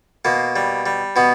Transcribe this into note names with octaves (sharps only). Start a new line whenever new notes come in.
B2 A#3
G3
G3
B2 B3